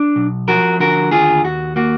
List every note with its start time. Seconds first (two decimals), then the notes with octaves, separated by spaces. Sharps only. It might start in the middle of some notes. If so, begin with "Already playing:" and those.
Already playing: D4
0.16 B1
0.48 F3 F#4 A#4
0.80 D3 F#4 A#4
1.11 D#2 F4 G#4
1.44 D#2 F#4
1.76 A#3 F#4